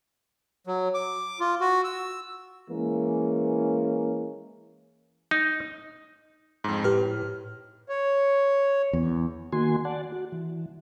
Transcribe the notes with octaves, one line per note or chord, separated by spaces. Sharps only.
F#3
D6
F4
F#4
E6
E3 G#3 A#3 C#4
D#4
F2 G#2
A2 G4 B4 F6
C#5
E2
D#3 A#3 F#4 G#5 C6
D5 F#5 A5
F#4
E3